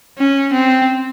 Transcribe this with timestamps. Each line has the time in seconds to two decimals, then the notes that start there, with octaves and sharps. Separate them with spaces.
0.18 C#4
0.53 C4